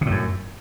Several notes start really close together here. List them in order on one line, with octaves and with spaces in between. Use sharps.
C3 A2 F#2